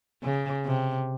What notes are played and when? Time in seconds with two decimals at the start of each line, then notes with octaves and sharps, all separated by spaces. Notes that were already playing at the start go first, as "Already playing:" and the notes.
0.23 C#3
0.65 C3